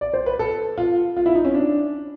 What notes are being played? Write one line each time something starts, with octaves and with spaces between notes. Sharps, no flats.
D5
C5
B4
A4
F4
F4
E4
D#4
C#4
D4